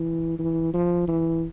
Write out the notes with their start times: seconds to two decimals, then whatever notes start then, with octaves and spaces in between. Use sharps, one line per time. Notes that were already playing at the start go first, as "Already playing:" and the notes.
Already playing: E3
0.39 E3
0.74 F3
1.08 E3